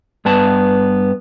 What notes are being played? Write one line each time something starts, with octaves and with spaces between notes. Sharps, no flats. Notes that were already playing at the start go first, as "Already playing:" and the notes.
G2 B3 A5